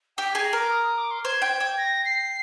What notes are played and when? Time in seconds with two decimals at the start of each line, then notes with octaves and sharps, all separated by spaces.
0.17 G4 G5
0.31 G#4 G#5
0.44 A#5
0.53 A#4 D6
0.71 D#6
0.84 D#6
0.98 D6
1.11 C6
1.24 C5 G#6
1.42 G5
1.60 G5
1.78 A#6
2.05 C7